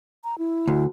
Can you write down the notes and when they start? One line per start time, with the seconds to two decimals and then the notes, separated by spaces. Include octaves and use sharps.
0.24 A#5
0.38 E4
0.67 D2